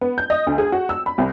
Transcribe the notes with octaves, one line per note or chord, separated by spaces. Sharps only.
B3
G6
D#5
D2
G#4
F#4
E6
B5
C2